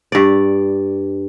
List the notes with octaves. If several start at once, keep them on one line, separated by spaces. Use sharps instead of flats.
G2 D5